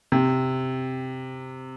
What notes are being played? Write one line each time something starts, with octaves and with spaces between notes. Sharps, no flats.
C3